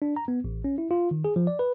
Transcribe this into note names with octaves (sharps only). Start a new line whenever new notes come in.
D4
A#5
B3
A1
C#4
E4
F4
D#3
G#4
F3
D5
B4